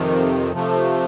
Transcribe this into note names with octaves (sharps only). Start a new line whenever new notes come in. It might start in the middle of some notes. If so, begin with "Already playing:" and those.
Already playing: F2 C3 D#3
C3 F3 A3